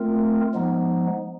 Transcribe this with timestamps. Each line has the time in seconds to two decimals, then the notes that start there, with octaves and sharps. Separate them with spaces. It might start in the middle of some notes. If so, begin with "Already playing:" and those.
Already playing: A3 C4 F4 A#4
0.54 F3 G#3 B3 D#4